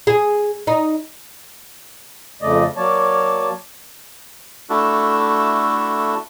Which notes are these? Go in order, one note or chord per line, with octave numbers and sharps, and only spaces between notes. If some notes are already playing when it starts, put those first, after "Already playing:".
G#4
D#4
F2 C#3 A3 D5 D#5
F#3 A#3 C#5 D5 A5
A3 D4 E4 F#4 A4